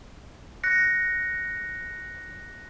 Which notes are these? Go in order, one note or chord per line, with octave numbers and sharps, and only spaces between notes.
F#6 A#6 C#7